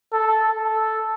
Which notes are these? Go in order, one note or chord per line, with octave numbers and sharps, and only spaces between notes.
A4
A4